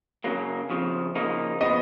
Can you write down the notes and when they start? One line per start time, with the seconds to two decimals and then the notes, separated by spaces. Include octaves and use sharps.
0.24 F#2 C#3 F#3 A#3
0.70 F2 C#3 F3
1.15 C#3 F3 A#3 D#4
1.61 C#3 F3 B3 D#5